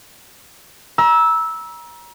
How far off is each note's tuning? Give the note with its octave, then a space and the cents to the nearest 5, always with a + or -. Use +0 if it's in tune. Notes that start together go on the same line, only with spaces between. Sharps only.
A#5 +35 E6 -10